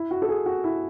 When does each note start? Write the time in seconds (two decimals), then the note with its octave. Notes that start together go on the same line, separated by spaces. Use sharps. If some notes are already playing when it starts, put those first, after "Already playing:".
Already playing: E4
0.11 F#4
0.22 A4
0.29 G#4
0.46 F#4
0.64 E4